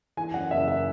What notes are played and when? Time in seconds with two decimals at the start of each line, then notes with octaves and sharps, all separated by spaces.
0.17 E3 G#5
0.34 F#2 F#5
0.51 F#1 E5
0.68 E5